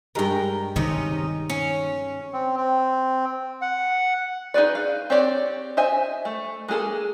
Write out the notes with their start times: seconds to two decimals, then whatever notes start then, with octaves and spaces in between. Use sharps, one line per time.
0.15 G2 G#3 A#4 B4 G5
0.76 C3 D#3 C#4 D#4
1.50 C#4
2.33 C4
2.57 C4
3.62 F#5
4.54 D#4 G#4 B4 D5
4.75 F5
5.10 C4 G4 C#5 D5
5.77 C5 D#5 E5 G#5
6.25 A3
6.68 G#3 A#3 G#4 A4